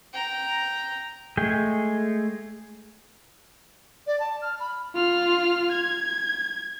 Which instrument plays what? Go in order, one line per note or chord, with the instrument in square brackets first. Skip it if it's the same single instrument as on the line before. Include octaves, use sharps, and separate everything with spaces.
[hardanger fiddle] G5 A#5
[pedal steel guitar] G#3 A3 G#4 G5
[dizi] D5
A5
F6
B5
[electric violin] F4 F6
G#6